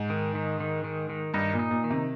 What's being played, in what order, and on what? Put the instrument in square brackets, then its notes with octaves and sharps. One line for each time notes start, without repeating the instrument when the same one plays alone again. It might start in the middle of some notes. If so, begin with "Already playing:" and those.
Already playing: [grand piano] G#2
[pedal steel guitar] D#3
D#3
D#3
D#3
D#3
[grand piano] G2 [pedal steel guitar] D#4
[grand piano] A#2
[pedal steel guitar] D#4
[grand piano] A#2
[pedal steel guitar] D#3
[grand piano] C3